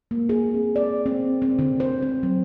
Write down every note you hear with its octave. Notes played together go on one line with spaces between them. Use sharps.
A#3
G#4
C4
D5
C4
C4
D3
C5
C4
F#3